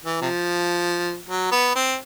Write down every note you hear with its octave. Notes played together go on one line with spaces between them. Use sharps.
E3
C3 F3
F#3
B3
C4